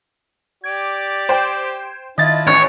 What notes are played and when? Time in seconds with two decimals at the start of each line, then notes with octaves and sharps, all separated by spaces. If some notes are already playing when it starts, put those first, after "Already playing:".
0.64 G4 D5 G#6 D7
1.29 C5 G5
2.18 D#3 D4 E4 F4 D#5 E5 G#6 A6
2.47 A1 C#5